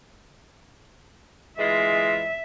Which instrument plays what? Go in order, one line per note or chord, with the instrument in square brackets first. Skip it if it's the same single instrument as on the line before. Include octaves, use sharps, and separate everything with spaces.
[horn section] E3 G#3 F4 [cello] E5